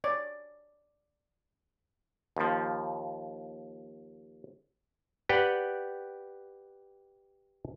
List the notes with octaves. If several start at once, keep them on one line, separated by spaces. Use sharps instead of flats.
C#5 D5
D#2 F3
G4 B4 D5 F#5 G5